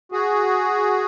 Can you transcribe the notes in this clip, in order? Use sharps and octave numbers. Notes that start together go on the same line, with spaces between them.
F#4 G#4